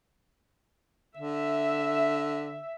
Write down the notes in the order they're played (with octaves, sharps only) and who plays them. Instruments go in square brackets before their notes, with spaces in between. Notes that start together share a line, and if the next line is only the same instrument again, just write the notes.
[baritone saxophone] D3 [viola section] E5